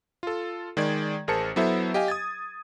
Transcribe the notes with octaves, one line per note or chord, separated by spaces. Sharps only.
F4 A4
D#3 G#3 D5 G#6
A1 G#4 A#4 C5 A5 C#7
F#3 B3 E4 A4 C5 E5
G4 D#5 F5 G#5
D#6 G#6 A6